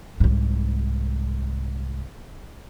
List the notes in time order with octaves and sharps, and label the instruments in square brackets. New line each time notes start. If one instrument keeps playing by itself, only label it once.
[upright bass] C2 G#2